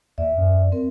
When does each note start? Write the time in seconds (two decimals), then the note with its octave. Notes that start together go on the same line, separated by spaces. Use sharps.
0.18 D#2 D5 E5
0.38 F#2
0.72 C4 A#4